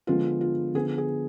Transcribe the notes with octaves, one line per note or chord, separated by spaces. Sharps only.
D3 F3 G#3 B3 F4
F4
D3 F3 B3 G#4
G#4